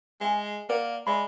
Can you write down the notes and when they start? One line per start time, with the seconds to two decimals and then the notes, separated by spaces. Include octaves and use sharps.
0.21 G#3 E5 G#5
0.69 A#3 A#4 D5 F#5
1.07 G#3 D5 E5 B5